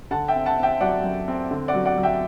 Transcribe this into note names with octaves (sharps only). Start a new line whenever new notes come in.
D3 F#5 A5
E5 G5
C4
F#5 A5
C4
E5 G5
F#3 D5 F#5
F#2
C4
D3
D5 F#5
F#3
D5 F#5
F#3
E5 G5